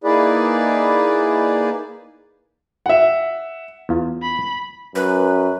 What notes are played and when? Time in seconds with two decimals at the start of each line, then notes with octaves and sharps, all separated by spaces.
0.04 A#3 D#4 E4 G#4 B4 D5
2.86 E5 F#5
3.89 E2 F4
4.22 B5
4.95 F#2 B4